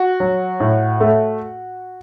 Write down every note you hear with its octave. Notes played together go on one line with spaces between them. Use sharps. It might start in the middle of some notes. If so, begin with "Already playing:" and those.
Already playing: F#4
F#3
A2
A3